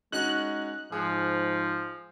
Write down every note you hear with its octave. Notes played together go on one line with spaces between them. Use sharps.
G#3 C#4 D#4 F#4 F#6
G#2 F3 G#4